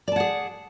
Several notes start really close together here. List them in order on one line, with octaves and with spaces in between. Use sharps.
D5 A5 F#5 G#4